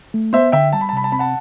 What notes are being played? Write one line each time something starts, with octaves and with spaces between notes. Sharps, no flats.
A3
B3 C5 E5
D3 E5 G5
G3 A5
B5
A5
C3 B5
A5
C4 B5
F#5 A5